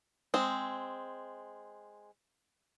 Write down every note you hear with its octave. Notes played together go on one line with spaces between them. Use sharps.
G#3 C4